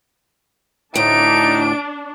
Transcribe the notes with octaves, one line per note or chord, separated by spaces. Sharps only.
D2 A2 D4 D#4 D7